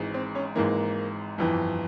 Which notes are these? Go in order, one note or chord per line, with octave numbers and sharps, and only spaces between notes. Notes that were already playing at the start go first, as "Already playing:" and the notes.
Already playing: G#1 G#2 E3
C4
C#4
G#1 G#2 E3 A#3
G1 F2 E3